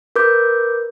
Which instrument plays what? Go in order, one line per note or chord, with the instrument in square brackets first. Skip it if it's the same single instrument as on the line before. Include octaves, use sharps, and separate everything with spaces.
[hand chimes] A#4 B4 D6 G6